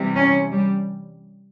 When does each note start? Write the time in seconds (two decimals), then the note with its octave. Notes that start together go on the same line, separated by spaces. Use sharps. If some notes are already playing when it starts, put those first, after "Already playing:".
Already playing: C3 E3 G3
0.16 C#4
0.51 G3